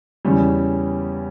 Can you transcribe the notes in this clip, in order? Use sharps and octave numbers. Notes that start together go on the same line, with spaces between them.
E2 C#3 G3 C#4